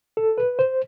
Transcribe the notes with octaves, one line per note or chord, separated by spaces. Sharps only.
A4
B4
C5